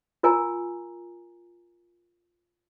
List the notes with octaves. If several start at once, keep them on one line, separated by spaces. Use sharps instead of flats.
F4 A#4 G#5 A#5